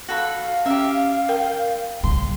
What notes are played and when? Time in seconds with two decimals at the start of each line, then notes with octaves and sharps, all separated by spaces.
0.08 F#4 A4 F5 B5
0.66 C#4 G4 E5
1.29 A#4 G5
2.03 C#3 G3 C6